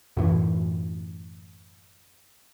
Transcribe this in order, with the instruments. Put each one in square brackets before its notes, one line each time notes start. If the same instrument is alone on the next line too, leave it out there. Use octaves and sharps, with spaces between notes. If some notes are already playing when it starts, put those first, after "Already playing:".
[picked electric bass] F#2 A2 E3